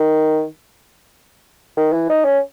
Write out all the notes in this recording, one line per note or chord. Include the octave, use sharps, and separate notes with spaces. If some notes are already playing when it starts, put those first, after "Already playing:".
Already playing: D#3
D#3
E3
D#4
C#4